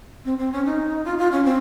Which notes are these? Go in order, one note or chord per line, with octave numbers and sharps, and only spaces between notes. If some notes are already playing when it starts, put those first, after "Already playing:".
C4
C4
C#4
D#4
F4
F4
C#4
C4